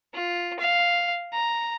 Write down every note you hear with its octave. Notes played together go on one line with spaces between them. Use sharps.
F4
F5
A#5